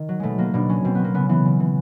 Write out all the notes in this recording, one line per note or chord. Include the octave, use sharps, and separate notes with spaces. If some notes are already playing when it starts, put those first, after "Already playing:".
Already playing: D#3
F#3
B2 G#3 A3
F#3 A#3
B2 D4
F#3 C#4
B2 C4
F#3 B3
A#3
C#3 B3
E3 B3
C#3
E3